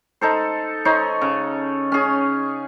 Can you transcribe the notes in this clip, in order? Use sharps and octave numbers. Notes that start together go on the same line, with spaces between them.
D#4 A4 C5
D#4 C5 C#5
C#3
C#4 G#4